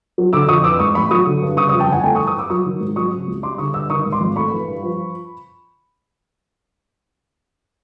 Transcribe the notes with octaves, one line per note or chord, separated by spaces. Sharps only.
F#3
D3 D6 E6
F2 C#6 D#6
E3 D6 E6
G#2 C#6 D#6
A1 B5 C#6
F#3 C#6 D#6
D3
G2
C#3 C#6 D#6
C#6 D#6
F2
G5 A5
G1 F#5 G#5
A3 G5 A5
C#6 D#6
E3
C#6 D#6
G2 D6 E6
F#3 C#6 D#6
D#3
G#2
F#3 C#6 D#6
C#3
C#2
G3 C6 D6
D3 C#6 D#6
G2 D6 E6
D#3 C#6 D#6
G#2
C6 D6
G#1
A3 B5 C#6
E3
G2
F3